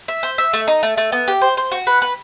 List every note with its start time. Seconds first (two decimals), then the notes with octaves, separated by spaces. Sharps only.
0.08 E5
0.23 C5
0.38 E5
0.53 A3
0.68 D#4
0.83 A3
0.97 A3
1.12 B3
1.28 G4
1.41 C5
1.57 C5
1.72 F#4
1.87 B4
2.02 B4